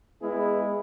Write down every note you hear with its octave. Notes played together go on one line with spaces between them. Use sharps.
G#3 B3 E4 G#4